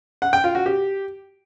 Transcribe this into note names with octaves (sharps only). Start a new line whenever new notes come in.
F#5
G5
F4
F#4
G4